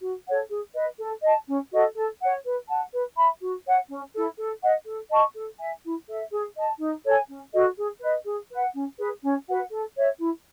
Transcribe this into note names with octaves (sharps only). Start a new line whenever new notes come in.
F#4
A4 C#5 F#5
G#4
B4 D#5
A4
D#5 A5
C#4
F#4 A4 D#5
A4
C#5 F#5
B4
F#5 A5
B4
E5 B5
F#4
C#5 F#5
C#4
E4 A4
A4
D#5 F#5
A4
D#5 A5 C#6
A4
E5 G#5
E4
A4 E5
G#4
D#5 A5
D#4
A4 C#5 G#5
C#4
F#4 A4 D#5
G#4
B4 D#5
G#4
B4 F#5
C#4
G#4 B4
C#4
F#4 B4 F#5
A4
C#5 E5
E4